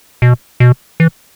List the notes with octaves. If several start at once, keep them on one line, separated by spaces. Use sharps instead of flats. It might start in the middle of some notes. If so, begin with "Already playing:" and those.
B2
B2
E3